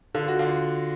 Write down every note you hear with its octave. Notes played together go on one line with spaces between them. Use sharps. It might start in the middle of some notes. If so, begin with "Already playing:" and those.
D3 F4
F#4
D3 F4